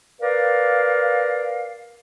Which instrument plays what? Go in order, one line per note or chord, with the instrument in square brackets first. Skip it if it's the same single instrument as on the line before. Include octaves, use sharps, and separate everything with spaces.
[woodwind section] A#4 B4 D5 F5